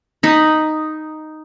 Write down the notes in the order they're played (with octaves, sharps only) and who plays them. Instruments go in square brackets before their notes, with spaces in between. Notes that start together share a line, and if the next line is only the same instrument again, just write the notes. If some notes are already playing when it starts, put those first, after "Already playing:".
[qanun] D#4 B5